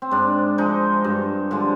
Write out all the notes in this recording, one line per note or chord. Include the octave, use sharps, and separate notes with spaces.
C4
G#2 D4
F3 G#3 D#4
G2
D3 F3 G#3